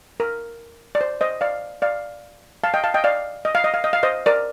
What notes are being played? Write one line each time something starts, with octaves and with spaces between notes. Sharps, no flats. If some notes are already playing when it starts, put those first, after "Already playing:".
A#4
D5
C5
C5 D#5
D5 F5
D5 F5
F5 A5
D#5 G5
F5 A5
D#5 G5
D5 F5
D#5
F5
D#5
F5
D#5
F5
C5 D#5
A#4 D5